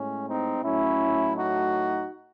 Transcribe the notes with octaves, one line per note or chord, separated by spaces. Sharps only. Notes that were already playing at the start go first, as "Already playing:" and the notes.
Already playing: A2 G#3 C#4
C4 D#4
A2 F#3 A3 C#4 E4
D#4 F#4